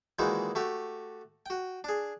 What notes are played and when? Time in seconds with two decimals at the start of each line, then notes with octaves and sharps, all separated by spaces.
0.19 A#2 D#3 E3 G#3 D#4 F#4
0.55 A3 F#4 G4
1.46 F#4 G5
1.84 D4 G#4